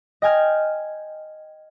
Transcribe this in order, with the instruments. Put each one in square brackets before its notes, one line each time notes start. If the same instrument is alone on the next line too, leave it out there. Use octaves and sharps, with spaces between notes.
[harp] D#5 G5 G#5 F6 G#6